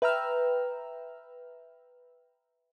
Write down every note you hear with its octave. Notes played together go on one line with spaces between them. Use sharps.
B4 E5 G5 A#5 E6 F6